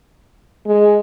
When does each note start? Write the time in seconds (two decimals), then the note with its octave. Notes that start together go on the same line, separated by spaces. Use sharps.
0.66 G#3